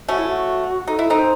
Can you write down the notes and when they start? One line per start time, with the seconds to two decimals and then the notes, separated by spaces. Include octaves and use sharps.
0.08 A3 C#4 F#4
0.18 E4
0.28 F#4
0.87 D#4 A4
0.99 E4 A4
1.10 C4 D#4
1.19 C5